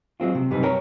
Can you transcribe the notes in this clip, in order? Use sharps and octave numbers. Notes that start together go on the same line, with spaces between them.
F#3 G#3 C4 F4
C3
F#2 C3 G3 D#4 B4
A#4 C#5 G5 A#5